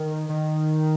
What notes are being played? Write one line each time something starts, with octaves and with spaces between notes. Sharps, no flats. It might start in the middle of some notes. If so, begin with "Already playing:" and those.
Already playing: D#3
D#3